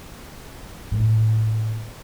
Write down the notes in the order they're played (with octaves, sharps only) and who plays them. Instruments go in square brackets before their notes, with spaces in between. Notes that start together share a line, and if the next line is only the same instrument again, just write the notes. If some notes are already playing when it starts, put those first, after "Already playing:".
[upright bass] A2 B3